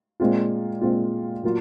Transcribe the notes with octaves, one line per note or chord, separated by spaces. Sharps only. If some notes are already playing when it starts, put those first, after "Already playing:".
A#2 G#3 C4 F4
A#2 G#3 C4 F4
A#2 F#3 A#3 F4